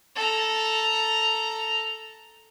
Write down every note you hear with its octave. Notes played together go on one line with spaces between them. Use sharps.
A4 A#5